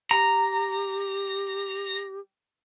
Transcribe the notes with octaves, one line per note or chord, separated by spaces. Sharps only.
G4 A#5